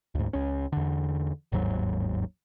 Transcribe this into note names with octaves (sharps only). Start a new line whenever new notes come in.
D2 G#2
C#2 C#4
E2 D3
G1 D#2 G#2 F#3